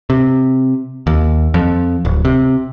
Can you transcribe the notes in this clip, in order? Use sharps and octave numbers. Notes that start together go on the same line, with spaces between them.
C3
D#2
F2
D1
C3